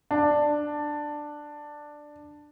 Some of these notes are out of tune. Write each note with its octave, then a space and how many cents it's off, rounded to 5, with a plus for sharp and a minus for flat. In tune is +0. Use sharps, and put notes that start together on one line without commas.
D4 +10